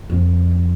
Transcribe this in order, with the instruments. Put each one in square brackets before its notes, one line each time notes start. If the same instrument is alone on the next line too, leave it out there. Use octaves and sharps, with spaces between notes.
[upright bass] F2